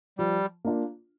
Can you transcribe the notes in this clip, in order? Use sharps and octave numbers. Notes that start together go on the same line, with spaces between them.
F3 G3
A#3 D4 F4